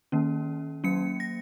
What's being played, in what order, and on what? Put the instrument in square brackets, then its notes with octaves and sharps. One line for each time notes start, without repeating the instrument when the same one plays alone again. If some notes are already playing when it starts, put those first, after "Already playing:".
[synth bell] D#3 A#3 C#4
F#3 A#3 C#4 C#7
A#6